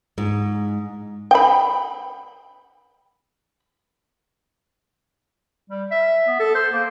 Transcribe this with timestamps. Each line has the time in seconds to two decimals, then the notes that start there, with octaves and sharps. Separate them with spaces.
0.18 G#2
1.31 G5 B5
5.70 G3
5.91 E5
6.28 B3
6.39 A4
6.55 C5
6.73 A#3